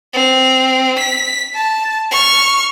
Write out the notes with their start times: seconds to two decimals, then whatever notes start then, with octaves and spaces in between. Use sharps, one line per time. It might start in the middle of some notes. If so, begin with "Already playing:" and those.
0.14 C4
0.99 B6
1.55 A5
2.11 C#6 F6